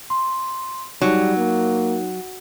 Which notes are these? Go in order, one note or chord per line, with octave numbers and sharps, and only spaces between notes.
C6
F#3 G3 D#4
A#3